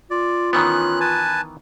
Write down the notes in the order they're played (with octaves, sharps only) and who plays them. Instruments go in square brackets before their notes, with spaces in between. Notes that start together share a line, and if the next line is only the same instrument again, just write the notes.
[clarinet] F4 [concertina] D5
[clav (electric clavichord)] D#3 E3 B3 [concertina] C#4 F#6
[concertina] B4 G#5 A5